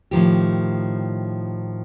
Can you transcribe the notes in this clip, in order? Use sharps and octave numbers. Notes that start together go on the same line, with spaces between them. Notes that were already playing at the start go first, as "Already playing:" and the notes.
A2 D#3 F3 G4